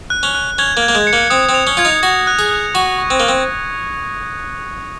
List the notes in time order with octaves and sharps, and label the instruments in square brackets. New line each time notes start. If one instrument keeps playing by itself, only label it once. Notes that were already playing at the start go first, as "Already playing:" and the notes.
[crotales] F#6
[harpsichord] C#4
[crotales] F#6
[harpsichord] C#4 [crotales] G#6
[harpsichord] A#3
[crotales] G#6
[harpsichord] A#3
G#3
[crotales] C#7
[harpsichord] A#3
[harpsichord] C4 [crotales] D#6
[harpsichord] C4
[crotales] F7
[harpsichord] C#4
[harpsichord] F4 [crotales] G#6
[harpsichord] D#4
[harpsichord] F#4 [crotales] A#6
[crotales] F#6
[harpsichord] G#4
[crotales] F#6
[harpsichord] F#4 [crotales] C#6
[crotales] C#6
[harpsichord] C4
[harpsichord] A#3 [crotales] C#6
[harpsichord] C4